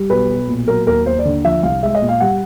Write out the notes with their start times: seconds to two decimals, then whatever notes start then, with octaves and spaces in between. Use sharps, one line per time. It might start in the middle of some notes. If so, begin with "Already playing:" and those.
Already playing: G3
0.10 B1 B4
0.29 B1
0.48 A#2
0.67 F#3 A#4
0.86 D#2 A#4
1.06 D#2 C5
1.19 D5
1.25 D3
1.44 F3 E5
1.63 C2 F5
1.83 G#3 E5
1.95 D#5
2.02 A#2
2.08 F5
2.20 G3 F#5